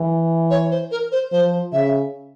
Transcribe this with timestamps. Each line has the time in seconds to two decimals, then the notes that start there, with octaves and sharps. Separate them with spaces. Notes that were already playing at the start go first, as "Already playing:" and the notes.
Already playing: E3
0.50 C#5
0.71 C5
0.91 A#4
1.12 C5
1.31 F3 C5
1.73 C#3 E5